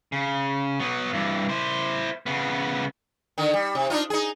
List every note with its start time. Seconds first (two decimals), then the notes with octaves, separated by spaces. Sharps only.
0.12 C#3
0.80 F#3 B3
1.13 G2 E3
1.49 E4 C5
2.26 C#3 B3
3.38 D3 D#3
3.54 G3
3.75 C3
3.90 D4 D#4 F4
4.10 D#4 G#4